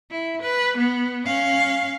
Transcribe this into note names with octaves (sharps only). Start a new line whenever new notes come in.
E4
B4
B3
C#4 F5